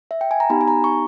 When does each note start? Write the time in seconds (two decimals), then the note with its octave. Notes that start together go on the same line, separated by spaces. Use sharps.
0.11 E5
0.21 G5
0.31 G#5
0.40 A#5
0.50 B3 D#4 G4 B5
0.61 G#5
0.68 A#5
0.84 C#6